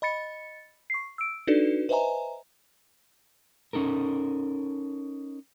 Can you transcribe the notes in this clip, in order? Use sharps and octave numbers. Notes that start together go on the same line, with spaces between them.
D#5 B5 A6 C#7
C#6 C7
E6 D7
D4 D#4 F#4 A4 B4 D5
B4 C5 D#5 E5 G#5 A#5
C#4 D#4 A4 A#4